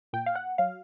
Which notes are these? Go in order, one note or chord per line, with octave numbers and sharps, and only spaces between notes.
A#2 G5
F5
F#5
F#3 F5